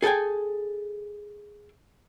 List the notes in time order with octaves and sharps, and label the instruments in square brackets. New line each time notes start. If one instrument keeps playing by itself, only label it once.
[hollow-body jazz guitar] G#4 A4 B4 G5 G#5